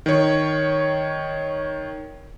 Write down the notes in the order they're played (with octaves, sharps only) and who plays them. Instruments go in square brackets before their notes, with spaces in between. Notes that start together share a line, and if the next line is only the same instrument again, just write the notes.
[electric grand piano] D#3 C#5